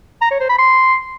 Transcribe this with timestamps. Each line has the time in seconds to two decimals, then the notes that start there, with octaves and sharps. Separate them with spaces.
0.21 A#5
0.31 C#5
0.40 C5
0.49 B5
0.59 C6